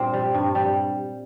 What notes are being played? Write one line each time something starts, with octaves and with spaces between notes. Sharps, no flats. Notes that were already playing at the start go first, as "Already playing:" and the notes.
Already playing: G2 A#2 C4
G3
G2
G3